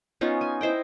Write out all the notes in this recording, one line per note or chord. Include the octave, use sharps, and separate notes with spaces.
B3 C#4 D#4 F4
G#5
E4 C5 D#5 G5